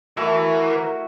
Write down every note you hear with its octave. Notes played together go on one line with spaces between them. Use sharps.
E3 A3 E4 F#4 A#4